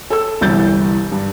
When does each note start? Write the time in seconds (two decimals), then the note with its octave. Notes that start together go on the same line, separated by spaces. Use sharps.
0.10 A4 E6
0.41 G1 C2 E3 G6 A6
1.12 G2